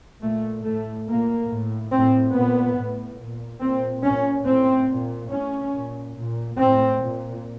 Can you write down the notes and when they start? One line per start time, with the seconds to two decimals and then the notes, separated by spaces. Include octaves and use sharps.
0.21 A#2 A3
0.64 A2 A3
1.07 A#2 A#3
1.49 A2
1.92 A2 C4
2.34 A#2 B3
2.77 A2
3.19 A#2
3.62 A#2 C4
4.03 A#2 C#4
4.46 A2 C4
4.88 A#2
5.31 A2 C#4
5.73 A#2
6.16 A#2
6.58 A2 C4
7.01 A#2